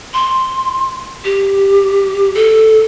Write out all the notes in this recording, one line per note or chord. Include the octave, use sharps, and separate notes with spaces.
C6
G4
A4